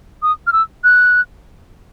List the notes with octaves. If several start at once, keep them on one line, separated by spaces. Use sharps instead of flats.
D#6
F6
E6
F#6